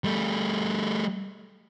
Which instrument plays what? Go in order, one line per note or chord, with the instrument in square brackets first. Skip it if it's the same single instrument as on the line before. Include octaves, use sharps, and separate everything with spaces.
[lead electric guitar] G3 A3